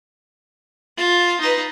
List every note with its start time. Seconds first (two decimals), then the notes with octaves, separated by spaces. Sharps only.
0.97 F4
1.41 D#4 B4